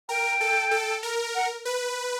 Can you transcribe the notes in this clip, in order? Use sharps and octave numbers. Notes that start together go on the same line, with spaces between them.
A#4 G5
A4
A4
A#4
F#5
B4